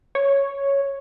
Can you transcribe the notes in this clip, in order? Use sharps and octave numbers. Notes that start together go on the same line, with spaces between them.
C#5